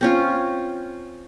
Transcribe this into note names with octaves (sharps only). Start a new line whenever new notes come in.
C4 C#4 F4